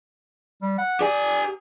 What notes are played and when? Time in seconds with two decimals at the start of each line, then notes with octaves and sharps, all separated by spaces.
0.62 G3
0.78 F#5
1.01 G4 D5 G#5